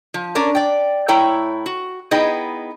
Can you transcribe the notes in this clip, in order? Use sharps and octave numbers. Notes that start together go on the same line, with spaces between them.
F3
C#4 D4 A#4 D5
D5 G5
A2 E4 C#5 G5 A#5
F#4
B3 D#4 E4 G#4 D#5 G5